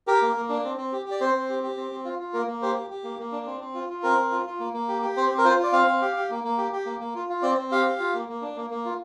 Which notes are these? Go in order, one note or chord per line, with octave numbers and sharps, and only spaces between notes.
G4 A#4
A#3
A#3
D4
C4
C4
G4
G4
D5
C4 C5
C4
G4
G4
C4
C4
F4
F4
A#3 A#4
A#3
G4 C5
G4
G4
A#3
A#3
D4
C4
C4
F4
F4
C4 A#4
C4
F4
F4
A#3
A#3
G4
G4
C4 C5
C4
A#4
F4 C5
F4 D5
C4 F5
C4
G4
G4
A#3
A#3
G4
G4
A#3
A#3
F4
F4
C4 D5
C4
G4 F5
G4
F4
A#3
A#3
D4
A#3
A#3
F4